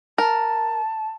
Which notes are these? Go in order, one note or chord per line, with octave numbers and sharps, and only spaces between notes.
A#4 A5